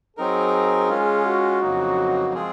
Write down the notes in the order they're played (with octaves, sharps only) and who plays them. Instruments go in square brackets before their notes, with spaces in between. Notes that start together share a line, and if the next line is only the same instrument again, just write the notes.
[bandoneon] F#3 C4 D#4 A#4 [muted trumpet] G#4
[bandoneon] G#3 C#4 F4
[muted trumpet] F#4
[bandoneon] F2 C#3 F#3 A#3 D#4
F3 G#3 C4 F4 G#4